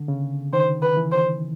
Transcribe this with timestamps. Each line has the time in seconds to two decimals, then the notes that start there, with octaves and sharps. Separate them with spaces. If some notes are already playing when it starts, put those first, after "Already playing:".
Already playing: D3
0.08 C#3
0.53 D#3 C5
0.82 B4
0.97 E3
1.12 C5